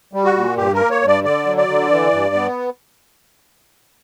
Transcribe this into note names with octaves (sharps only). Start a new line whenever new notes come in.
G3
F#4
A#2
G2 G4
A#4
A#3
C#5
G2
D5
D3 D5
F#3
D5
D3
E3
G2
B3